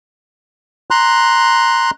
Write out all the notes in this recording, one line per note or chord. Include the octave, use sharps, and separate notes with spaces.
A#5 C6 F#6